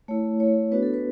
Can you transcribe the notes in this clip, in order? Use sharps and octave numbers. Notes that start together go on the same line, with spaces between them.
A3 E4 C#5
A3 E4 C#5
B3 D4 F#4 B4
A4
B4